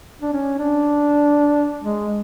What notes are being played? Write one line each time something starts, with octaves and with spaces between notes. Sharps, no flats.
D4
C#4
D4
G#3